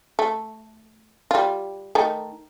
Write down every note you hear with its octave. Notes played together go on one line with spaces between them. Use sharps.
A3
G3 F4
D#3 A3 D#4